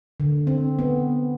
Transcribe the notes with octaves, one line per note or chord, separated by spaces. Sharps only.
D3
C4
B3